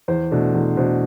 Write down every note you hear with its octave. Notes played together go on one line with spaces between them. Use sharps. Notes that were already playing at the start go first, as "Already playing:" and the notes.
E2 C5
B2 A3 D4
E2
B2 A3 D4 C5